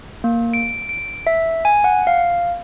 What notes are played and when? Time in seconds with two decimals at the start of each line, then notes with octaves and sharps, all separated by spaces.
0.24 A#3
0.54 D7
0.89 D7
1.27 E5
1.65 G#5
1.84 F#5
2.07 F5